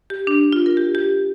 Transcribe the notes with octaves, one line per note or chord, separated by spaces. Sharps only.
G4
D4
F4
A#4
G4
G4